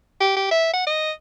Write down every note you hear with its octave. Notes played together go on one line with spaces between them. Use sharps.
G4
G4
E5
F#5
D#5